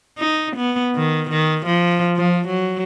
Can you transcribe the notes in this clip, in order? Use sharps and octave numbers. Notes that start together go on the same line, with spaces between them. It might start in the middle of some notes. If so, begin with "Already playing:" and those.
D#4
B3
D#3
D#3
F3
F3
F#3